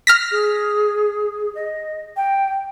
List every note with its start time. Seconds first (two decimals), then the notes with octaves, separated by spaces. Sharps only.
0.07 F6 A#6 B6
0.32 G#4
1.55 D#5
2.17 G5